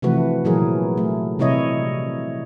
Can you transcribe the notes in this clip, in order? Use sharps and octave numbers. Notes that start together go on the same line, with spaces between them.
C3 E3 F3 A3 F#4 B4
A#2 E3 F#3 G#4 A#4
A3
C3 G3 E4 C#5 D#5